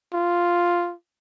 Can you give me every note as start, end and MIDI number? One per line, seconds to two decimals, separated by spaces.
0.13 0.93 65